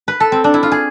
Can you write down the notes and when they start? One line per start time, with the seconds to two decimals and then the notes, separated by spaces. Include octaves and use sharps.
0.08 B4
0.20 A4
0.32 C4
0.44 D4
0.54 E4
0.63 F4
0.72 G#4